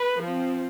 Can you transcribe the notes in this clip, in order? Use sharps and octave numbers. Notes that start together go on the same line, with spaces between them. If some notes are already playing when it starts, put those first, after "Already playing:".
Already playing: B4
F3 C4